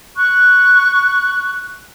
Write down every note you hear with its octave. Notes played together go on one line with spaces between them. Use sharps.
C#6 F#6